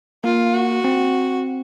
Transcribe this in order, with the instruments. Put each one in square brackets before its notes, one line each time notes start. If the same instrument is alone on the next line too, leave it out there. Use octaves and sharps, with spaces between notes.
[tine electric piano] A#3 [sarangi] F4
[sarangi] F#4
[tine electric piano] C4